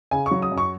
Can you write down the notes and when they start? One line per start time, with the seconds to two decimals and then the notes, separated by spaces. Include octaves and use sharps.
0.11 C#3 G#5
0.26 C#6
0.31 F#3
0.42 D#6
0.52 F#2
0.58 C#6